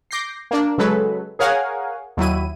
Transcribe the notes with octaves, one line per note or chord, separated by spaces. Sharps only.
D6 G6 A#6 C7
A#3 D4
C#3 F#3 G#3 A4 B4
G#4 A#4 C#5 F5 F#5 G#5
D#2 F#3 E4 D#7